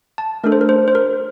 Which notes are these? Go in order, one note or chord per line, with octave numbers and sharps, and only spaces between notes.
A5
A3 D4 A4 A#4
C5
A#4
C5
C5
A#4